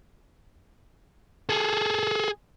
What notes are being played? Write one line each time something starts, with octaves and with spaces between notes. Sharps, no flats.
G#4 A4